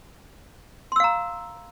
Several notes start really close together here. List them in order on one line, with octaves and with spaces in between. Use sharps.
C6 E6 F5 A#5